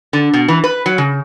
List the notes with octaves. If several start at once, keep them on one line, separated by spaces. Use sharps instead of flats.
D3
B2
E3
B4
F#3
C#3